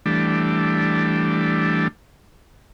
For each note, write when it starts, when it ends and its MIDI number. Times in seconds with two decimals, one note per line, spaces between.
0.06 1.88 52
0.06 1.88 55
0.06 1.88 57
0.06 1.88 62